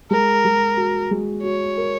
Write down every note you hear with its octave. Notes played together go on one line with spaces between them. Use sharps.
G#3 A#4
G#3
F#4
G#3
F#4 C#5
A#4